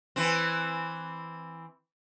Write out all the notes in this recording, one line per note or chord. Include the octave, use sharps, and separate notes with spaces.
E3 C4